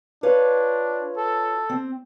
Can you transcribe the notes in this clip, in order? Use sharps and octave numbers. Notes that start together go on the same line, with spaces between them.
D4 F4 B4 C#5
A4
C4